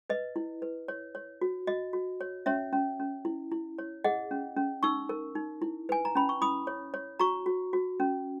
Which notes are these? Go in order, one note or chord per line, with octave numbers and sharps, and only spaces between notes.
B4 D#5
E4
B4
C#5
C#5
F#4
F#4 D#5
F#4
C#5
C#4 C#5 E5
C#4
C#4
E4
E4
C#5
G#4 D#5 F#5
C#4
C#4
D#4 C#6 E6
A#4
D#4
E4
B4 G#5
A#5
C#4 B5
C#6
E4 B5 D#6
C#5
C#5
F#4 A#5 C#6
F#4
F#4
C#4